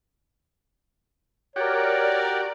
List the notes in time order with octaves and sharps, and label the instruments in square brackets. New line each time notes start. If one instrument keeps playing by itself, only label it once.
[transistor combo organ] F#4 G4 [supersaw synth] A#4 D5 [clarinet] C#5